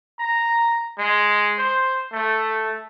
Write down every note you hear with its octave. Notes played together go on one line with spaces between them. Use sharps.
A#5
G#3
C5
A3